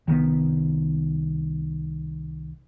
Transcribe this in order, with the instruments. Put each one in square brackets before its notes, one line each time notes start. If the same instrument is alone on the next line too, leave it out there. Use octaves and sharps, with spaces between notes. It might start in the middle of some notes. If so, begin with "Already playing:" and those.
[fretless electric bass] C2 D#3 G3 B3